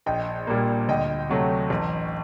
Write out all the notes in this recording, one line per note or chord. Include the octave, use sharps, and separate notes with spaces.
A#1 D#5 G5
A#2 G3 A#3
D2 D#5 G5
C3 F#3 A3
A1